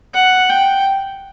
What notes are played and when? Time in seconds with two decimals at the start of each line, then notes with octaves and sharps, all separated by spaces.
0.14 F#5
0.50 G5